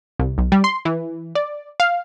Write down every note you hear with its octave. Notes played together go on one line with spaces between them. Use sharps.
C2
B1
G3
C6
E3
D5
F5